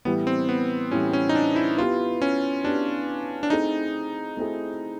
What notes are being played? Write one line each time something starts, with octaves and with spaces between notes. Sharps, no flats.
A2 E3 G3 B3
C4
B3
A2 E3 G3 C#4
C#4
D#4
D4
E4
B3 E4 F4 G4 B4
C#4
B3 D4 E4 G4 B4
D4
A3 C4 D#4 E4 G#4
A3 C4 E4 G#4